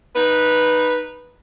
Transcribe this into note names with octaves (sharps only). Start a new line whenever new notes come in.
D#4 B4